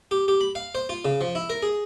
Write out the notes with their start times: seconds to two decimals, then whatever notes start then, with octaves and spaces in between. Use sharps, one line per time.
0.11 G4
0.28 G4
0.41 B5
0.55 F5
0.75 C5
0.89 F4
1.05 C#3
1.21 F3
1.35 E4
1.50 A#4
1.63 G#4